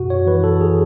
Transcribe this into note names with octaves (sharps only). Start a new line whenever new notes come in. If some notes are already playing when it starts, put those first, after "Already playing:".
Already playing: F#2 B2 F#4
C#5
E3 B4
A4
G#4